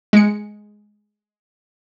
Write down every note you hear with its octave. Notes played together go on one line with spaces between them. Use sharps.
G#3 C#7